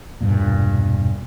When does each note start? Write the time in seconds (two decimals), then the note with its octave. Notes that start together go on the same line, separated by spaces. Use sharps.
0.21 E1 G2 A#2